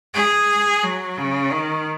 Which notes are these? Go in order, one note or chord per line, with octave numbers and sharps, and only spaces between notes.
G#4
F#3
C#3
D#3